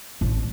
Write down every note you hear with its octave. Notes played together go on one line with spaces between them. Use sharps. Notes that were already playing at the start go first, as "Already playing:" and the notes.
A1